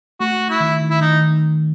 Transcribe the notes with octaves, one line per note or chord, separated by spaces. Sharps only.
A3 F#4
A3
E4
D#3
D#3
E4
D#3 D#4
D#3